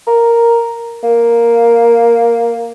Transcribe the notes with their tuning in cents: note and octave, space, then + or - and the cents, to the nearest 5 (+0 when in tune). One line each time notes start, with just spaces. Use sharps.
A#4 +0
A#3 +0